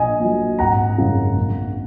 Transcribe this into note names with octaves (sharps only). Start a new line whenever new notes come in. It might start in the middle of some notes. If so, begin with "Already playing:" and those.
Already playing: A#1 D#5 G#5
A#2 F#3
G#1 F#5 A#5
F#2 C#3
A#1